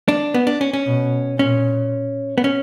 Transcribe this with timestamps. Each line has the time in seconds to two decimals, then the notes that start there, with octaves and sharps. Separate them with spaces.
0.08 D4
0.34 B3
0.47 D4
0.61 C#4
0.73 C#4
0.86 B2
1.39 A#2 C#4
2.38 B3
2.44 C#4